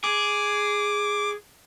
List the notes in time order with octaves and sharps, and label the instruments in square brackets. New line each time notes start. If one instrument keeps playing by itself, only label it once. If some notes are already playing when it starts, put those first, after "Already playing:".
[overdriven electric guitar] G#4 [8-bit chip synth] D6